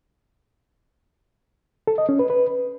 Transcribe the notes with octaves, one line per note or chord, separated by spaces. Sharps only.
A4
D#5
C#4
B4
B4